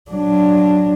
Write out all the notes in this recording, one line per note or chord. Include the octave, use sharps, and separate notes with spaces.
F#3 D4